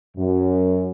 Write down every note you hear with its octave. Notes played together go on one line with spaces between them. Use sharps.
F#2